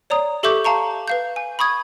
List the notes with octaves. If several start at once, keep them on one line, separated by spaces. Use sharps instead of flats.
C#5 D5 A#5 D#6
G4 A4 E5 C#6 D6 G6
F5 A5 A#5 C#6
B4 F5 G6
G#5
B5 C#6 D#6 G#6